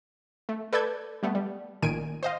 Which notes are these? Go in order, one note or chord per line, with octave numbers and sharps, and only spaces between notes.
A3
A4 B4 D5 G6 G#6
G3 A3 B3
G3
A1 A#2 D#3 G#5 D7 D#7
C5 D#5 F5